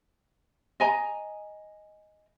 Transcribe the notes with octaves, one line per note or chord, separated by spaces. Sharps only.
D#5 G#5 A#5